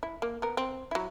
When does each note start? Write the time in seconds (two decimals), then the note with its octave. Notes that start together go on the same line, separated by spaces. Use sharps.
0.03 E4
0.22 A#3
0.42 B3 A#4
0.57 C4
0.91 F#3 E4